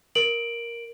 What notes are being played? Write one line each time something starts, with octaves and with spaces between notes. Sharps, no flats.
A#4 D7 F#7